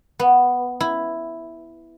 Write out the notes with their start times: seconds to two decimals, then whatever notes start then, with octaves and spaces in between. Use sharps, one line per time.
0.19 B3
0.80 E4